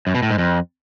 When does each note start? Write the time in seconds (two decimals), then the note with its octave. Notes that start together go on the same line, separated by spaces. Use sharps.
0.07 F#2
0.15 B2
0.23 A2
0.30 G#2
0.38 F2